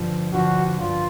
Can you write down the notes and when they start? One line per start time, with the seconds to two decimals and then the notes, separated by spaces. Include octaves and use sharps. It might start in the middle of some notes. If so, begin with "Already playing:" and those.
Already playing: G2 D3 F3
0.33 G2 D3 F3 F#4
0.79 G2 D3 F3 F4